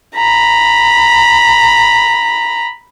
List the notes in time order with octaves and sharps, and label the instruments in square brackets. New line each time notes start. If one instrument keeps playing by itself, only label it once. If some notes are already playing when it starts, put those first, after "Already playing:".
[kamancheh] A#5 B5